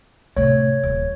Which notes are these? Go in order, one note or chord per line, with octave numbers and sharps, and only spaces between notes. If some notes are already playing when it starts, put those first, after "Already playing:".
A2 C3 C#5
D#1